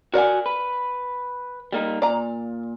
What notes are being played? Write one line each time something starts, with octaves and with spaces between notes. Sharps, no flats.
F#4 A#4 D5 F#5 G#5
B4
G3 A#3 D#4
A#2 D5 A#5